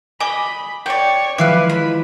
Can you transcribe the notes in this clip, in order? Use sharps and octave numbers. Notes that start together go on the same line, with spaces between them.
D#5 G#5 B5 D6
C#5 D5 G5
E3 F3 G#3 E4 B4 F5 D6 F#6
B5